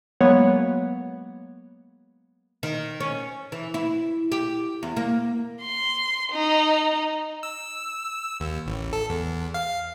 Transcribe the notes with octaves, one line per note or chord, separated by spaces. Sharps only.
F#3 G#3 A#3 B3 C#5 F#5
D#3
C#4
E3
E4
G4
E2
A#3
C6
D#4
E6
D#2
A1
A4
E2
F5